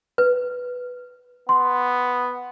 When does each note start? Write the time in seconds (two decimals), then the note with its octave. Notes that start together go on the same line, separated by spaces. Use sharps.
0.18 B4
1.49 B3 C6